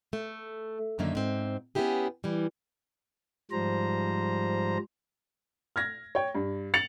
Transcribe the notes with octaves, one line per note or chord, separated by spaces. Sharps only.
A3
F#2 D3 D#3 A#3 E5
G#2 C4
B3 C#4 D4 E4 G4 G#4
E3 G3
G#2 F3 G3 C5 A#5
F6 G#6 A#6
C#5 G5
G2
A6 C#7 F7 F#7